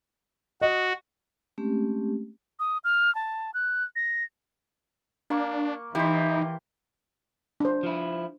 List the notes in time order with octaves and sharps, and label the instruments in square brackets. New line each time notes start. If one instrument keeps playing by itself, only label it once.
[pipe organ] F#4 [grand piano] D#5
[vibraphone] G#3 A3 C4 C#4 G4
[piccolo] D#6
F6
A5
F#6
A#6
[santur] A#3 C#6 [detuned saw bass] D4
[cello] E3 [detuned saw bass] D#4 [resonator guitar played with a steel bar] E4 [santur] G4 C5
[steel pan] D4 C5
[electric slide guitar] F3 E4